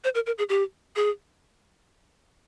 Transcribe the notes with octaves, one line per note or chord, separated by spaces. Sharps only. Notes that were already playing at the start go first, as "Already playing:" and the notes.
C5
A#4
A#4
G#4
G4
G#4